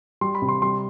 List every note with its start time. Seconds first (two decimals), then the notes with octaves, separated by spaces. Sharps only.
0.21 G3 C6
0.35 B5
0.42 C3
0.49 C6
0.62 G3 C6